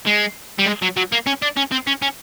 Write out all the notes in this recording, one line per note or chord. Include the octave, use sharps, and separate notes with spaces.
G#3
G3
G#3
F#3
F#3
A#3
C#4
D4
C#4
C4
C#4
C#4